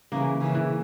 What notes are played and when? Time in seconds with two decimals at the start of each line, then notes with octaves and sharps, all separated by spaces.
0.12 C#3 E3 A#3
0.41 C#3 E3
0.55 E3